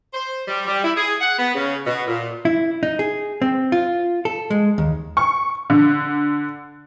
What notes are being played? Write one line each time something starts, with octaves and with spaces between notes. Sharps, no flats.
C5
G3
G3
E4
G#4
F#5
B3
C#3
B2
A#2
E4
D#4
G#4
C4
F4
A4
G#3
D#2
C#6
D3